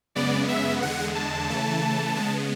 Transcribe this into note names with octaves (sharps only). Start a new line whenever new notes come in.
F#2 C#3 G#3 B3 D5
E5
E2 D3 G#3 F#5
A5
C#3 E3 A3
C#3 G#3 B3